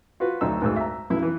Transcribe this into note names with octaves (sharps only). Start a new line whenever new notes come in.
F4 F#4 B4
D2 F#3 D#4 E6
D2 G#2 E6
E5 A#5
B1 F#2 E4
E3